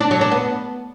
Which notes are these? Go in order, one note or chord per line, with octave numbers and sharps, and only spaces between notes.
D4
F#3
D4
B3